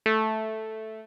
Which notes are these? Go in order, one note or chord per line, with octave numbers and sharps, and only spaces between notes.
A3